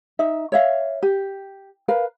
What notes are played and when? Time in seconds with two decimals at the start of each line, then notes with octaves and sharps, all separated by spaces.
0.19 D#4 E5
0.52 C#5 E5 F5
1.02 G4
1.88 A#4 B4 F5